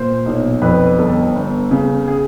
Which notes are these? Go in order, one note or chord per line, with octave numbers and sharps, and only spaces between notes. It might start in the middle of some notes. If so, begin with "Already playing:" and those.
Already playing: A#2 C5
B1
F2 B4
G1 A4
G1
C#3
G#4